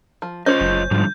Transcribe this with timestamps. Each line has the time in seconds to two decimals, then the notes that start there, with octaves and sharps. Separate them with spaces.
0.22 F3
0.46 C#4 F4 C5 C#5 D#5 G6
0.61 F#1
0.91 G#2 D3 F3 G3